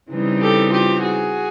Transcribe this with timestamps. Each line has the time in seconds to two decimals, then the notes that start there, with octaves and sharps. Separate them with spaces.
0.11 C#3 E3 G3 C4 D#4
0.42 G4 A4
0.73 F4 G4
1.02 F#4 G#4